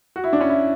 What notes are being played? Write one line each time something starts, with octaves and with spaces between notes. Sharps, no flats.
F#4
E4
D4
C#4
E4